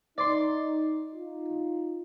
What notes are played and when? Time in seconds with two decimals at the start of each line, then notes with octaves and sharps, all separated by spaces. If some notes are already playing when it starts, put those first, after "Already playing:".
0.18 D#4 D5 C6
1.14 D#4 F4